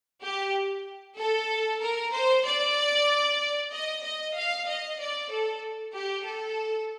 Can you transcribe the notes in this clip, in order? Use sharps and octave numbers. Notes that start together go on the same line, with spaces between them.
G4
A4
A#4
C5
D5
D#5
D#5
F5
D#5
D5
A4
G4
A4